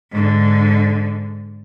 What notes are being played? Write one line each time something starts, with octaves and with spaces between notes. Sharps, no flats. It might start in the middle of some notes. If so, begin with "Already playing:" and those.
G#2 D3